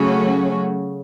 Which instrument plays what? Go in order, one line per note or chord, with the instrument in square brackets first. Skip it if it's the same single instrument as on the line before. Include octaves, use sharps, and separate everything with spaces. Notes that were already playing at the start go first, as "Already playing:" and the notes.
Already playing: [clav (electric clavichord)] C#3 [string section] F#3 A3 C#4 F#4